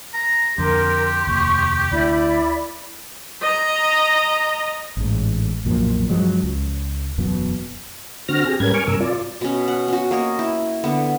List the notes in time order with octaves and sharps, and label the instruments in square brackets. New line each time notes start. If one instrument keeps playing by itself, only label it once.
[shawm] A#5
[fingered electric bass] F2 D3 [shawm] G4 [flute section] A#4 [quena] C6
[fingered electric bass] F1 D#2 [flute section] C#6
[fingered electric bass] D2 [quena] E4 [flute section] D5 B5
[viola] D#5 A#5
[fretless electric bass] A1 G#2
B1 F#2 A#2 F3
G2 F3 F#3 G#3
C#2
E1 F#2 B2 F#3
[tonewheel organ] D3 C4 F#4 F6 A#6
G4 G#4
G#2 G3 C#4 A#4 B4 G#6
G#5 C#6 D6 F6
G2 C3 A#4 E6
F4 D5
[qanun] B2 C#4
F#5
C#4 F#4
A#3 C#5 D#5
E4
D3 B3